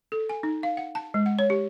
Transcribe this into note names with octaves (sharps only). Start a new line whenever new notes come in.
A4
G#5
D#4
F5
F#5
A5
G#3
F#5
C#5
G4